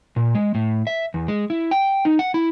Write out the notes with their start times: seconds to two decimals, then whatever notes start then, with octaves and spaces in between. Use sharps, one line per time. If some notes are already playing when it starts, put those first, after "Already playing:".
0.16 A#2
0.35 G#3
0.55 A2
0.87 E5
1.14 E2
1.28 G#3
1.50 E4
1.71 G5
2.05 D#4
2.19 F#5
2.34 E4